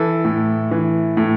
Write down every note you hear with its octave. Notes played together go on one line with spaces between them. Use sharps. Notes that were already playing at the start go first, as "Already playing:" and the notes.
Already playing: E3 A4
A2
E3
A2